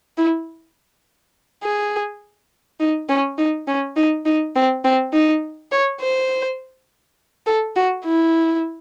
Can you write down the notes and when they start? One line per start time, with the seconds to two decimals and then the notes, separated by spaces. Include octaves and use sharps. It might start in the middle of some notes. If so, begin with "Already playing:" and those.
0.17 E4
1.63 G#4
2.80 D#4
3.09 C#4
3.38 D#4
3.68 C#4
3.97 D#4
4.26 D#4
4.56 C4
4.85 C4
5.13 D#4
5.72 C#5
6.01 C5
7.46 A4
7.76 F#4
8.05 E4